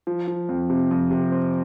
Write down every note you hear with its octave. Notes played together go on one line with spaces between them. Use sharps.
F3
F3
F2
C3
F2
C3
C4